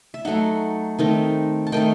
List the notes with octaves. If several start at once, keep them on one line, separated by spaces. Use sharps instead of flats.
E5
F#3 A3 D#4 F#5
D#3 A3 C4 D#4
A5
D#3 A3 D#4 G5